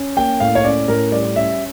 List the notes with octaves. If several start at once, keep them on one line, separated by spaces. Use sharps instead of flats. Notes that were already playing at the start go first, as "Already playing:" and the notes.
Already playing: C#4
A#3 G5
A2 F5
C#5
C#4 D5
A2 A#4
G3 D5
C#4 E5